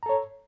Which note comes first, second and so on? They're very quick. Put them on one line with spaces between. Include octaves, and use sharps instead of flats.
A#5 A4 C#5